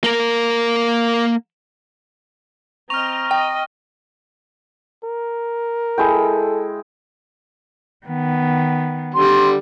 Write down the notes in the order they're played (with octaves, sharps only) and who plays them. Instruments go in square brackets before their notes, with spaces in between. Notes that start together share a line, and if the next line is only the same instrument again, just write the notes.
[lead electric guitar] A#3 A#4
[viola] C4 D#5 [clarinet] A#5 [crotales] C#6 F6 [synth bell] F7
[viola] D#5 [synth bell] G5
[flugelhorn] A#4
[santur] G#3 E4 G5 [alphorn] A4
[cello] D#3 B3
[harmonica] D3 G3 [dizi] C6